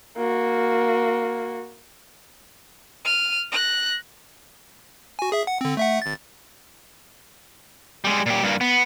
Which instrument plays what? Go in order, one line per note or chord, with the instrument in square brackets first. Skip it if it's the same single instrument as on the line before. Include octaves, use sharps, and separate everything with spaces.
[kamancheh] A#3 F#4
[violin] F6 D#7
F#6 A#6
[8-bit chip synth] F#4 G#5
G#4 E5
F#5
D3 C4
A3 E5 F#5
G#1 A6
[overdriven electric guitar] G3 G#3
A#2 G4
G2 A#3
B3